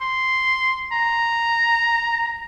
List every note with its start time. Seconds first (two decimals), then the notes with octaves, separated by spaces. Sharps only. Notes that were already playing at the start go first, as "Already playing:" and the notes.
0.01 C6
0.92 A#5